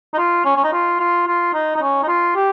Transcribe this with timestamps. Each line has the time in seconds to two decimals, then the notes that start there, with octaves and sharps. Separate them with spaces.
0.14 D#4
0.18 F4
0.45 C#4
0.56 C#4
0.64 D#4
0.73 F4
1.00 F4
1.27 F4
1.54 D#4
1.76 D#4
1.82 C#4
2.03 D#4
2.08 F4
2.36 G4